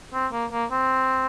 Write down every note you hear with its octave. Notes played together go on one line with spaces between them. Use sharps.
C4
A#3
A#3
C4